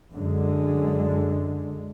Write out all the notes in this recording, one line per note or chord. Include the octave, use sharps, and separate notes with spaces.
F#2 D3 G#3